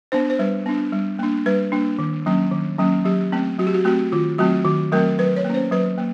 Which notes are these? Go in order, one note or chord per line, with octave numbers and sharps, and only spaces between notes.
B3 D4 C5
C5
G3 B4
B3 D4
G3
A#3 D4
G3 B4
A#3 D4
D#3
F#3 A#3 C#4
D#3
F#3 A#3 C#4
F#3 G4
A3 C4
F#3 F#4
G4
F#4
A3 C4 F#4
D#3 F4
F#3 A3 C4 F#4
D#3 F#4
F#3 A3 C4 A#4
F#3 B4
C#5
A#3
C#4 C5
F#3 B4
A#3